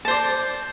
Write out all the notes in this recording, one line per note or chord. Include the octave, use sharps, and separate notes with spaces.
C5 D5 A5